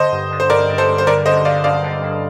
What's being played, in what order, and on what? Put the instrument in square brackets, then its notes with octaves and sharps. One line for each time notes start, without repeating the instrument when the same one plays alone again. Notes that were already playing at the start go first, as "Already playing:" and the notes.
Already playing: [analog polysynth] D3 [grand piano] C5 D#5
[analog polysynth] G2
D3
[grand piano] C5
[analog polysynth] G2 [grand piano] A#4 D5
[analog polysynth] G2
[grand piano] A4 C5
[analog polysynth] G2
[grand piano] C5
[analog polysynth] D3 [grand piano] A#4 D5
[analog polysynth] D3 [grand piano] C5 D#5
[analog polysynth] D3 [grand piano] D5 F5
[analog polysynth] G2 [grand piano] D5 F5
[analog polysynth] D3
G2